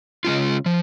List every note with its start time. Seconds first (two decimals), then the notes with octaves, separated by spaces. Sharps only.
0.25 C#3 G#3 C#4 F4
0.66 F3